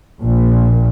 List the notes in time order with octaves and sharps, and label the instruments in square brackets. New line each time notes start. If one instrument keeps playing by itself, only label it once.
[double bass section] A#1 A#2